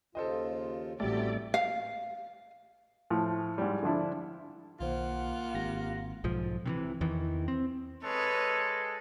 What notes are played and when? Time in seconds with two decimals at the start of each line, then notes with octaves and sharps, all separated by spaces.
0.15 D#2 C#3 F4 A4 C5 D#5
1.00 A1 F#3 G3 A3 C4 G4 D5
1.54 F5
3.10 A2 F3
3.58 G#2 G3
3.83 D3 F3 D4 E4
4.80 B1 D#3 A#3 F4 C5 F#5
5.55 G#1 G4 A#6
6.24 B1 G#2 F3
6.66 C3 D#3 E3
7.01 E2 D#3 E3
7.48 C4
8.03 G#3 A4 B4 C#5